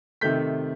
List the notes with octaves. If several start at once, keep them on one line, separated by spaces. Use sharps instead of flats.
C3 D#3 A3 G6 B6